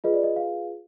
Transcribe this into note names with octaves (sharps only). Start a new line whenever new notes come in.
F4 G#4 B4 D#5
D5
D#5
F5